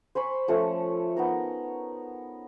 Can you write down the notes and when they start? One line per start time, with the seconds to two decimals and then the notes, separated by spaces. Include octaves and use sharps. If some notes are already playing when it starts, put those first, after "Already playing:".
0.15 C5 G#5 B5 C#6
0.48 F3 A3 C#4
1.17 B3 D#4 A#4